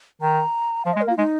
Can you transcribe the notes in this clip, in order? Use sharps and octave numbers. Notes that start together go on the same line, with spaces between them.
D#3 A#5
F3 F5
G#3 D#5
A#4
A#3
F4
G#3 D#4